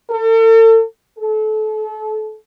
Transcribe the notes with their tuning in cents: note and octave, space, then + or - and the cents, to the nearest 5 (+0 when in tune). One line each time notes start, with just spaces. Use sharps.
A4 +40
A4 -30